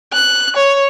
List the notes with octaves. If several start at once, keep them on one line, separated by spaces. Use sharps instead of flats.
F#6
C#5